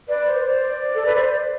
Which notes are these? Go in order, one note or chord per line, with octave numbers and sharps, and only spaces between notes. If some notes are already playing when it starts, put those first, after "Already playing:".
B4 D5
C5
B4
C5 D5
D5
A4
B4
C5